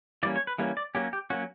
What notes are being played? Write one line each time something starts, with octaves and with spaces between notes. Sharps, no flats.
E3 G3 A#3 C#4 D5
C#5
B4
E3 G3 A#3 C#4
D5
F#3 A#3 C#4 G4
G4
F#3 A#3 C#4 F#4